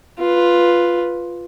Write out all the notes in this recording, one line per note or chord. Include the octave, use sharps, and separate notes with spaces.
F4 B4